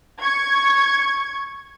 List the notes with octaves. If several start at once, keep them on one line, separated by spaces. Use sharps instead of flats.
C#6 G#6